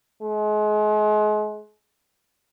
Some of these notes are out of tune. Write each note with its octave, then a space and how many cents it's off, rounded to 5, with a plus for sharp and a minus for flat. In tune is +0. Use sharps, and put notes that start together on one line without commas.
G#3 +35